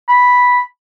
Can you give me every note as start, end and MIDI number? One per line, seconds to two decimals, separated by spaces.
0.08 0.60 83